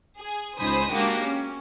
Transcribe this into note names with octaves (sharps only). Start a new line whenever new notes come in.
G#4
C#2 D#4 C5 G#5 B5 D#6
G#3 A#3 D4 F#4 G4
C#4